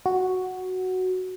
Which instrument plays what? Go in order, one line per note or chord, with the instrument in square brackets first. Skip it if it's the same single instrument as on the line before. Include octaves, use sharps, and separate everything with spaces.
[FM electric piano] F#4